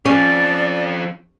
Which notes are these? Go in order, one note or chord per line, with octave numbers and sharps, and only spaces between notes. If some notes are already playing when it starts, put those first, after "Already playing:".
F2 F3 C#4 D5